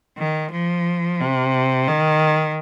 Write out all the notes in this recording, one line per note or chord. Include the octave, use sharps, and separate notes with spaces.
D#3
F3
C3
D#3